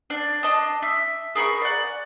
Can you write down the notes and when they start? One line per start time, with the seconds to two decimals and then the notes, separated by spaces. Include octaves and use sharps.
0.10 D4
0.43 D4 D#5 A5 D#6
0.82 E5
1.35 G#4 A#4 B5 C#6
1.62 D5 F#5